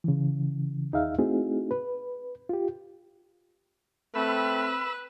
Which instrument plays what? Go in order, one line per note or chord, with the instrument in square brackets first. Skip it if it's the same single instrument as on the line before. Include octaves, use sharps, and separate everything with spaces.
[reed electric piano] C#3 E3
D#2 D#4 G#4 E5 F5
A3 C4 D#4 E4 F#4 G#4
B4
F4 G4
[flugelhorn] A3 [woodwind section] C4 [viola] B4 [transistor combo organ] B5 E6